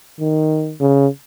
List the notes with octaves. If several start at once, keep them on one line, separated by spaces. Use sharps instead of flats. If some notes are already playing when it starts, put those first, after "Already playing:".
D#3
C#3